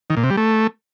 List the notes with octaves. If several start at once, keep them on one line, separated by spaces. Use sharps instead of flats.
D#3
A#2
C3
G3
A3